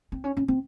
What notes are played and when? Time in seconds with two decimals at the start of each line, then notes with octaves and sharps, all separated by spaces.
0.12 C4
0.24 C#4
0.37 C#4
0.48 C4